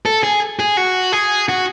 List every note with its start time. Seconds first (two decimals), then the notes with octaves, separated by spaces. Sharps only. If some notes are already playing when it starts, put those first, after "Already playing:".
0.06 A4
0.23 G#4
0.59 G#4
0.77 F#4
1.13 G#4
1.49 F#4